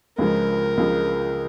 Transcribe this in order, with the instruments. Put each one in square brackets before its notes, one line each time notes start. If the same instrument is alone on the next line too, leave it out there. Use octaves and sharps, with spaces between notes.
[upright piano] C#2 C#3 F3 G#3 [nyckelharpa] A#4
[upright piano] C#2 C#3 F3 G#3